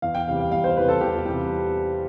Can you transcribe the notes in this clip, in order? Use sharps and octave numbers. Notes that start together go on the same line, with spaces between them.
E2 F5
G5
C3 E3 G3 F5
F5
E2 F5
C5
C3 E3 G3 B4
A4
E2 G4
F4
C3 E3 G3 G4